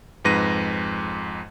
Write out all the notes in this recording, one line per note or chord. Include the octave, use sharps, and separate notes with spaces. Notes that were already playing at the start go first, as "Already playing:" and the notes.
F2 G#2 B4 A#6 D#7